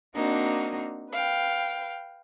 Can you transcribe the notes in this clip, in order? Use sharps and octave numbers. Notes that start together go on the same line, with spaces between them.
A#3 C4 D4 D#4 F#4
B4 F5 G5